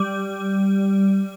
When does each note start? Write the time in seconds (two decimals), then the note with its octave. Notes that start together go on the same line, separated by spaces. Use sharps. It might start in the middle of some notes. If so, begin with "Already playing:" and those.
Already playing: G3